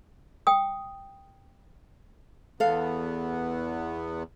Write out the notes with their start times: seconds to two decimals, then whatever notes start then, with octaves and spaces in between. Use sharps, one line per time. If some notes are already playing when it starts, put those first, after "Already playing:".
0.47 G5 D#6
2.60 E2 B3 A4 F5